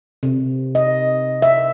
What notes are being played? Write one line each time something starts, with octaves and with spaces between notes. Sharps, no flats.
C3
D#5
E5